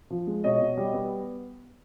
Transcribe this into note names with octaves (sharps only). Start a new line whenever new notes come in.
F3
G#3
B2 C#5 D#5
B2
G3
B3